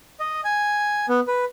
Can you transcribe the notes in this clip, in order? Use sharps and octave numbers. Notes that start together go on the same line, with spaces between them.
D#5
G#5
B3
B4